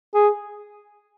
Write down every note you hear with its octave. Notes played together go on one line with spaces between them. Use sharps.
G#4